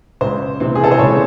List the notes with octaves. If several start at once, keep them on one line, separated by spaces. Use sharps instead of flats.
C#2 C5
C3 E3 C4
G#4
A4
C5
C#2 C#5